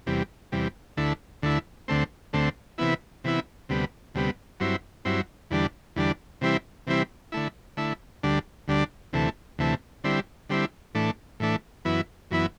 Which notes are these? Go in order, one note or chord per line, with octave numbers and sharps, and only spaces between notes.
E2 C3 G3
E2 C3 G3
D2 D3 A3 E4
D2 D3 A3 E4
D2 D3 A3 C4
D2 D3 A3 C4
C3 E3 B3 E4
C3 E3 B3 E4
D2 C3 G3 B3
D2 C3 G3 B3
G2 F#3 C4 E4
G2 F#3 C4 E4
E2 D3 G3 D4
E2 D3 G3 D4
C3 E3 G3 C4 E4
C3 E3 G3 C4 E4
D3 A3 E4
D3 A3 E4
D2 D3 G3 D4
D2 D3 G3 D4
D2 C3 E3 A3
D2 C3 E3 A3
D3 G3 C4 E4
D3 G3 C4 E4
A2 E3 A3 D4
A2 E3 A3 D4
F#2 E3 B3 E4
F#2 E3 B3 E4